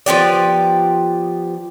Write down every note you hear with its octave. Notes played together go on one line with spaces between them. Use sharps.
F3 B3 G4 D5